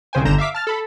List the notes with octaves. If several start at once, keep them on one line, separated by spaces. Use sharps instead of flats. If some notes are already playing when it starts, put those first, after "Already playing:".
C2 C#3 C5 G5 G#5
G1 D3 A#5 G6 E7
E5 F5 D6 B6
A5 F6 A6
A4 B5